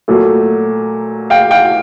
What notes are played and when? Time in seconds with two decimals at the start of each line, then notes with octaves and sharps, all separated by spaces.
0.08 A#2 F#3 A3
1.30 F5 G5
1.51 F5 G5